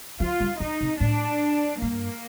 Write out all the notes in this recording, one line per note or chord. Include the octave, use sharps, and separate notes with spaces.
F3 F4
G3
F3 D#4
C3
A2 D4
G2 A#3